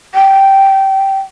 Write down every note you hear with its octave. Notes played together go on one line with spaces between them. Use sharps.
G5